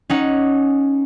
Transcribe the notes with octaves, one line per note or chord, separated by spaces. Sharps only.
C#4 D#4 F#5